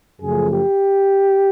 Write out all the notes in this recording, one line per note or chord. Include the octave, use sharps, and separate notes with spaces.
F#2 C#3 F3 A3 G#4
G4